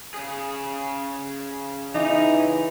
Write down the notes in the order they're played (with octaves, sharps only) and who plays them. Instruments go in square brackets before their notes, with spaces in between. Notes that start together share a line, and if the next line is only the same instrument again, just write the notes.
[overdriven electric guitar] C#3 G#4
[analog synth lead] E3 [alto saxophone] D#4